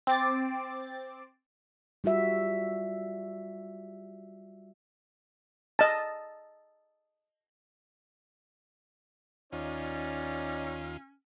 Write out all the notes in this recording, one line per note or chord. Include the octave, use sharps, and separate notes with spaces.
C4 D6 A6
G3 F4 F#4 E5
D#5 A5
D#2 C#4 D#4 F4 C#5 D5